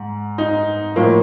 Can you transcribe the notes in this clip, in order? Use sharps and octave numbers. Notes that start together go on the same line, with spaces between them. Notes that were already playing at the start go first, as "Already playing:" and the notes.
Already playing: G#2
D#4
A2 F3 A#3